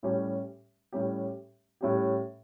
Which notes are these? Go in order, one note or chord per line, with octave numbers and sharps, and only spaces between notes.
A2 G3 C#4 G4
A2 G3 C#4 G4
A2 G3 C#4 G4